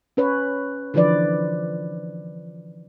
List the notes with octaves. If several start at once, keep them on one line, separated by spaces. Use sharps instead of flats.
C#4 B4 C#5
D3 E3 F3 B4 D5